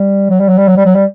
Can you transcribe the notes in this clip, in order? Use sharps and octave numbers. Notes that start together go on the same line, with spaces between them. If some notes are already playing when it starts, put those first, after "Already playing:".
Already playing: G3
F#3
G3
F#3
G3
F#3
G3
F#3
G3